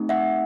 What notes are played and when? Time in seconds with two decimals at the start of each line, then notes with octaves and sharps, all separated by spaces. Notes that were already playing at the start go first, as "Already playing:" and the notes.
Already playing: A3 C4 D#4 G4
0.09 E5 F#5